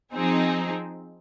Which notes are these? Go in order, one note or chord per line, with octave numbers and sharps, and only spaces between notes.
F3 C4 D#4 G#4